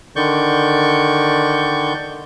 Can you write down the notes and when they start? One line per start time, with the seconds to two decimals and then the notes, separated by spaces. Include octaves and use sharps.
0.16 D3 D#3 D5 C#6 G6